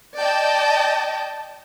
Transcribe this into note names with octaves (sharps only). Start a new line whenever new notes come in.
D5 D#5 G5 A5